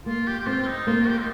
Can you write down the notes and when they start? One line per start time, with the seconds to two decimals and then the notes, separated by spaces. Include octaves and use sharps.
0.06 A#3 F4
0.27 G4
0.39 G4
0.46 C4 F4
0.62 F4
0.67 D#4
0.87 A#3 F4
1.07 G4
1.18 D#4